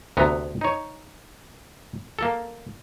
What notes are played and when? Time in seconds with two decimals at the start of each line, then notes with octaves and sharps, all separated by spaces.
0.17 D2 C3 B3 A#5
0.61 D#4 C#5
2.19 A#3 A4